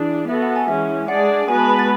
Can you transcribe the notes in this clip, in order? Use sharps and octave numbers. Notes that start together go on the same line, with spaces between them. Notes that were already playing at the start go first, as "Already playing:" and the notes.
Already playing: E3 D4 G#4
B3 F#4 A4 E5
F#5
G#5
E3 G#3 C#4 E5
G#3 D4 G#4 D5 F#5
G#3 B3 F#4 B4 G#5
A5
B5
A6